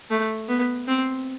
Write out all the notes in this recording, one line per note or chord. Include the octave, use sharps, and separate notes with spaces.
A3
B3
C4